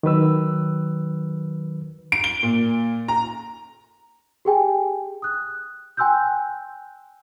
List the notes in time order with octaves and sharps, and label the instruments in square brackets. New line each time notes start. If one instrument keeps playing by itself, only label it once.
[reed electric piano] D#3 F#3 B4 E6
[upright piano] D7
G7
A#2
A#5
[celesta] G4 G#4 G5 G#5
D#6 F#6
G5 G#5 C6 E6 F#6 G6